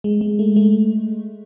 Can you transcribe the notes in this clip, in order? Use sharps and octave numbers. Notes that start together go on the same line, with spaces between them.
G#3
G#3
A3
A3